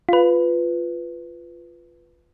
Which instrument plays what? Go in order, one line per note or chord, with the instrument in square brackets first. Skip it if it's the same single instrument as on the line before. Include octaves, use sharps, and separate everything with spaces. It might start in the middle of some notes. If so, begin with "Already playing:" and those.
[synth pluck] F4 B4